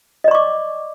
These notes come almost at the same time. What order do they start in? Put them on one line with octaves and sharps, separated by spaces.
D#5 D5 C#6 D6